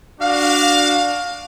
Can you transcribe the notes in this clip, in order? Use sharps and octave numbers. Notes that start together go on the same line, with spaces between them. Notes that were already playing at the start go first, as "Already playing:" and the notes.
D4 F#4 F5